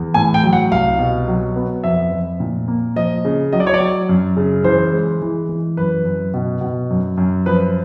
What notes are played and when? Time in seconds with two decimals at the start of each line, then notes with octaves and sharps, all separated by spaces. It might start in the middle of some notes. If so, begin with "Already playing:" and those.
Already playing: E2
0.14 A2 G#5
0.34 G5
0.44 F#3
0.53 F#5
0.71 C2 F5
0.99 B2
1.28 F#3
1.56 B3
1.84 F2 E5
2.11 F2
2.40 A#2
2.68 A#3
2.96 F3 D#5
3.25 C#3
3.53 F#3 D#5
3.60 D5
3.67 C#5
3.74 D5
3.80 F#3
4.09 F#2
4.37 C#3
4.64 E3 C5
4.93 G#3
5.22 E3
5.49 E3
5.77 F#2 B4
6.05 F#2
6.34 B2
6.61 B2
6.90 F#2
7.17 F#2
7.46 F3 B4